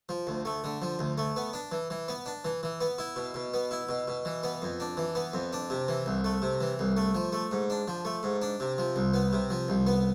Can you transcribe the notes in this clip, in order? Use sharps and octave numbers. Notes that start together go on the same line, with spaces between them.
F3
D2
A3
D3
F3
D2
A3
B3
D4
E3
E3
B3
D4
E3
E3
B3
E4
B2
B2
B3
E4
B2
B2
E3
B3
F2
D4
E3
B3
F2
D4
C3
E3
C2
A3
C3
E3
C2
A3
F3
A3
G#2
D4
F3
A3
G#2
D4
C3
F3
C2
B3
C3
F3
C2
B3